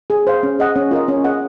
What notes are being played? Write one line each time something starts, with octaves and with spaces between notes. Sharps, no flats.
G#4
C5 F5
C#4
G#4 D#5 F#5
C#4
F4 A#4 D#5
C#4
G#4 D#5 F#5